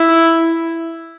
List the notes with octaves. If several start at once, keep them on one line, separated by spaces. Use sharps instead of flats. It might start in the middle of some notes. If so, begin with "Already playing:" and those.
Already playing: E4